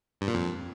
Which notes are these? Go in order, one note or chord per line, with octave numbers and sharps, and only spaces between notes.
G2
A#2
F2